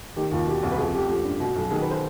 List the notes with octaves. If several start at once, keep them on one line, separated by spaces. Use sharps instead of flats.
D#3 G4
D#2 F4
B2 G4
C2
B4
F2 G#4
F1 G4
F3 G4
G2
B2
B1
D#3 G#4
B4
C5